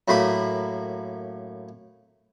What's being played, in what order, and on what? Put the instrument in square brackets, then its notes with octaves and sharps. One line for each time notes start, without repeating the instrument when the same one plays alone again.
[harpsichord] F#2 A2 A#3 B5